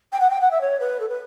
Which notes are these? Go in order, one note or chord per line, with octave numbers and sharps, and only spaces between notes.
G5
F#5
G5
F#5
E5
C#5
B4
A4
B4